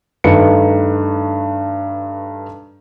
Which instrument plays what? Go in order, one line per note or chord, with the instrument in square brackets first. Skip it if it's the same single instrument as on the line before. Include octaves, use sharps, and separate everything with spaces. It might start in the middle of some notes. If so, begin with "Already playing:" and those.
[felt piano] G2 D#3 A3 B4 C#7